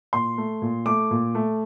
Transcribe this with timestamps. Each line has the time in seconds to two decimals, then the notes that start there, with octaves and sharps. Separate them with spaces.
0.13 A#2 C6
0.38 A3
0.62 A#2
0.86 A3 D6
1.11 A#2
1.35 A3